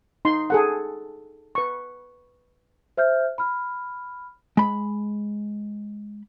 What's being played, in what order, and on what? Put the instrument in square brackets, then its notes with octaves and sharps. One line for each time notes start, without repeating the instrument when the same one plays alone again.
[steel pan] D#4 C6
G#4 A4 F#5
B4 C#6
[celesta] C5 E5 F6 G6
B5 F6
[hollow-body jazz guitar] G#3 B5